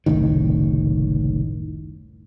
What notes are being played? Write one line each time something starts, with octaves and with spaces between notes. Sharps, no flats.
F#1 C2 A2 D#3